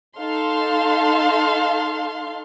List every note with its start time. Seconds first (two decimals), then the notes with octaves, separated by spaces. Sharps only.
0.18 D#4 A4 F5 C6